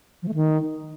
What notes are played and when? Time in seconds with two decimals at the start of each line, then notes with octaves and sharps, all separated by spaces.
0.23 F3
0.28 A3
0.34 D#3